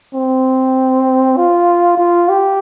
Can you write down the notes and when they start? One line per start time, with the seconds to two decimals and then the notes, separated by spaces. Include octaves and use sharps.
0.15 C4
1.37 F4
1.98 F4
2.29 G4